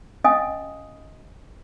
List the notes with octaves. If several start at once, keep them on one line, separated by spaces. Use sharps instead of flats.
C#4 D#5 F5 G#5 D#6